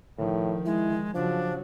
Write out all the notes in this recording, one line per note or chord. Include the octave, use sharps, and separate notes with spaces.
A2 D#3 F3
G#3 E4
C#3 F3 F#3 D4